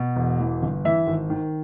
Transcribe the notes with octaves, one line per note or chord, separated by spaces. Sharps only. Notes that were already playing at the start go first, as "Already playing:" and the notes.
Already playing: B2
E1
E3
G1
E3 E5
G#1
D#3